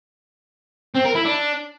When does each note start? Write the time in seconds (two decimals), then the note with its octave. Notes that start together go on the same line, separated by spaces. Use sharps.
0.95 C4
1.05 A#4
1.15 E4
1.25 D4